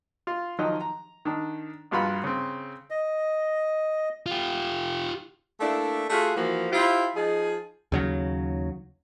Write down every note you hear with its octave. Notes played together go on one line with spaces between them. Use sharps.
F4
D#3 F3 F#3 D#5
A#5
D#3 D4
A#1 G2 F4 F#4 B5
C#3 C4
D#5
F4 G4
A3 A#3 D4 E4
A3 F4 F#4 G#4
E3 F3 A#3 F#4
E4 F4 G4 C5
F3 D#4 G#4
D#2 C#3 F#3